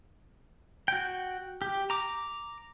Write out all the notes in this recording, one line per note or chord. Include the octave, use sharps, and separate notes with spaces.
F#4 G5
G4
A#5 D6